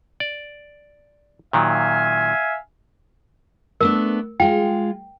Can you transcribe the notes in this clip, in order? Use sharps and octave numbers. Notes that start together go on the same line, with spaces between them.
D5
A#2 D#3 F#3 E5 F5 G#5
A3 B3 D4 A#4
G#3 F4 G5